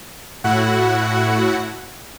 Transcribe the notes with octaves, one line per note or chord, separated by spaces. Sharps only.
A2 E4 F#4 F#5